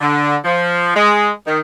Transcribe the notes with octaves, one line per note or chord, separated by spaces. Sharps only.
D3
F3
G#3
D#3